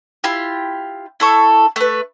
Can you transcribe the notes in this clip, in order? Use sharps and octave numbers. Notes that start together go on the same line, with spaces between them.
E4 F4 G4
E4 A4 C#6
A3 B4